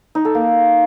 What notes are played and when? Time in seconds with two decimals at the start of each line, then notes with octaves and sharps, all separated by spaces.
0.15 D#4
0.25 A4
0.35 A#3